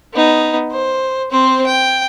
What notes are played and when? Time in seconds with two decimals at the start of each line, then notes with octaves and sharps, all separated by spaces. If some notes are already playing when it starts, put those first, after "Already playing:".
0.14 B3 D#4
0.71 C5
1.31 C4 C5
1.66 G5